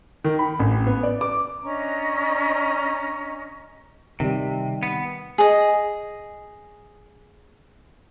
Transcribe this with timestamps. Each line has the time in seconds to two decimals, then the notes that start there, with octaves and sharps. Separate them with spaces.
0.24 D#3
0.39 B5
0.60 A1
0.87 B3
1.03 D5
1.21 D6
1.63 C#4 D4 D#5 A#5
4.20 C3 D#3 G3
4.83 B3
5.38 G#4 D#5